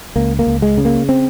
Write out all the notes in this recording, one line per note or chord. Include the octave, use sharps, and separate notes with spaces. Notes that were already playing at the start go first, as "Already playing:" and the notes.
C#2 A#3
A#3
C#2
G#3
C#3
A#3
C4